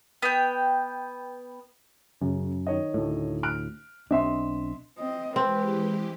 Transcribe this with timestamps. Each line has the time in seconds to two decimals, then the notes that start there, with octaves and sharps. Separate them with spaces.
0.22 B3 G5
2.21 F#2 C#3
2.67 D#3 C#5 D#5
2.94 D2 A2
3.43 F6 F#6 D7
4.11 B1 C4 D4 D#5 E5 C6
4.98 C4 D#5
5.36 E3 G#3 C4 G4 B4